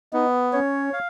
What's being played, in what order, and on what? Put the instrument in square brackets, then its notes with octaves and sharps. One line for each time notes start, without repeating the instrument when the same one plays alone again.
[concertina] B3 [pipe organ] D#4
[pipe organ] C#4 [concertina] C#5
[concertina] F5